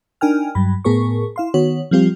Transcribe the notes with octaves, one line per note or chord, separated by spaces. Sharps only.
D4 D#4 A#4 G5 G#5 F6
G2 F#3 B5
A2 B3 G#4 A#4 C#6
E4 F5 C6
D#3 B3 F#4 C#5
F3 G3 C4 F4 G4